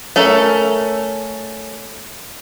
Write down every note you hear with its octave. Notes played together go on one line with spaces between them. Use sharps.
A3 C#4 A4 A#4